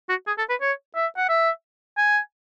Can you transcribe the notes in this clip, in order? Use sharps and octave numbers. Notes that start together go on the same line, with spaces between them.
F#4
G#4
A4
B4
C#5
E5
F#5
E5
G#5